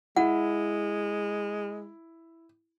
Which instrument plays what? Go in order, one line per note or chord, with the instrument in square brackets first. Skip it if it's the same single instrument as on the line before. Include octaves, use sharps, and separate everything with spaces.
[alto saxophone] G#3 [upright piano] E4 [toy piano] F#5